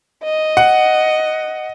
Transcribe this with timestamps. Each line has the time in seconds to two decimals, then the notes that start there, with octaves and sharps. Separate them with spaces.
0.24 D#5
0.57 F#5